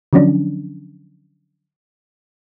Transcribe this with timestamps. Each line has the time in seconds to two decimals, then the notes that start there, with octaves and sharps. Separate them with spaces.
0.13 D3 F3 F#3 C#4 D4